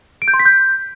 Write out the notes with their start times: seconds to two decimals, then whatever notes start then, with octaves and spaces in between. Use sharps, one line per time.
0.22 D7
0.28 G6
0.34 C6
0.39 B6
0.45 G6